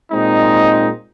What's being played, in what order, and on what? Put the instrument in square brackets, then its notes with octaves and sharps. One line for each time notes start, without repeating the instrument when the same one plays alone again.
[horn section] A#2 G#3 C4 D#4